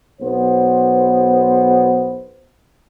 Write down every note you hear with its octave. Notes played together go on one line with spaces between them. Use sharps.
B1 B3 C5